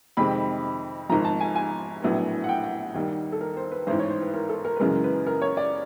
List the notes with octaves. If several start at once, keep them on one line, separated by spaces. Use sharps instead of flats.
F2 C3 D#3 G#3 C4 B5
G#1 G#2 F3 A#5
A5
G#5
G#5
A#1 A2 F#3 B3
F#5
G5
F#5
D#2 D#3 G3
A4
A#4
C5
B4
A1 G#2 E3 C5
C#5
C5
B4
A#4
A4
A#4
B4
F#2 C#3 E3 G#3 A#4
B4
A#4
C#5
D5